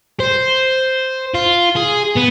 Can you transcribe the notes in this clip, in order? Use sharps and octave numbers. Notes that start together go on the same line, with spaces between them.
C5
F4
G#4
B3